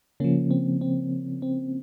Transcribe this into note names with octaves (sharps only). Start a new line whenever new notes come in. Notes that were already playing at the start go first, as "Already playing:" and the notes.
C#3 F3 A#3 C#4
C4
C4
C4